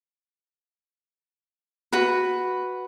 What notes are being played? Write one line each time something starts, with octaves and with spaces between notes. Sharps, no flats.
F#4 B4